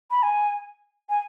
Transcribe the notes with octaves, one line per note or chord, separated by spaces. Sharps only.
B5
G#5
G#5